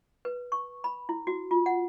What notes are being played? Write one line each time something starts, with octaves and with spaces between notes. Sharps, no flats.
B4
C#6
B5
E4
F#4
F4
F#5